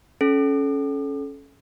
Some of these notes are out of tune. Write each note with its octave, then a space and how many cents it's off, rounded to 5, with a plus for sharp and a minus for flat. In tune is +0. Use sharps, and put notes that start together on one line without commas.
C#4 +0 A4 -25